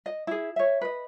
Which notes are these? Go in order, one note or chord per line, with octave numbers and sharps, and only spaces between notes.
D#5
E4 G#4
C#5 E5
B4 D#5